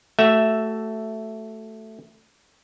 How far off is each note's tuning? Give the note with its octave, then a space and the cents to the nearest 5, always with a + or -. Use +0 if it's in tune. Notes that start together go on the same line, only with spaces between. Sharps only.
A3 +0 F#4 +25 E5 +0